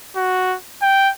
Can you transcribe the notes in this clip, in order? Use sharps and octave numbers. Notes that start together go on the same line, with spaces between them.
F#4
G5